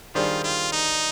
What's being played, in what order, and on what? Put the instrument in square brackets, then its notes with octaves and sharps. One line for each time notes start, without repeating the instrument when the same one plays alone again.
[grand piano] D#3 G3 D4 G#4 C5 [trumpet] F4
[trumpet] F4
D#4